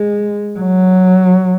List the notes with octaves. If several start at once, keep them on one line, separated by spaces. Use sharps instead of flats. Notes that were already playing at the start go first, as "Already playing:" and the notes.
Already playing: G#3
F#3